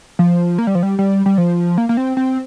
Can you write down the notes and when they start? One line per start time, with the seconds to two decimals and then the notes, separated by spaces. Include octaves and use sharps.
0.19 F3
0.58 A#3
0.67 G3
0.75 F3
0.83 G3
0.99 G3
1.26 G3
1.38 F3
1.78 A#3
1.89 A#3
1.97 C4
2.17 C4